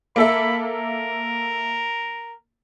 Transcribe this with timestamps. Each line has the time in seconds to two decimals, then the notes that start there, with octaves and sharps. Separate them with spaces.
0.16 A#3 A4 E5 B5
0.63 A#4